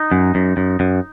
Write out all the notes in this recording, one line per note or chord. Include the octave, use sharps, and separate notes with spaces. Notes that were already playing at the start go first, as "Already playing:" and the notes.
Already playing: D#4
F#2
F#2
F#2
F#2